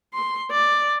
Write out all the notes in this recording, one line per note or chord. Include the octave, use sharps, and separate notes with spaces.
C6
D5